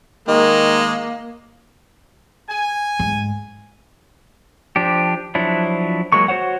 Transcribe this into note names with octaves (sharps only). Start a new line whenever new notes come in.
D#3 G#3 A#3
G#5
D2 G#2
F3 D4 G4
F3 F#3 D4 E4
F#3 G#3 A#3 C#6
F#4 C5 C#5 F#5